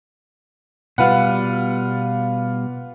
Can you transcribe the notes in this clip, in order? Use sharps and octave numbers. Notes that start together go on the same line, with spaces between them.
B2 G3 F4 B4 F#5